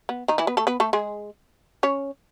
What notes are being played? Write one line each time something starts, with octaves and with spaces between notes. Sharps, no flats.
B3
D#3 D#4
E3 E4
B3 B4
A3 A4
B3 B4
A3 A4
G#3 G#4
C#4 C#5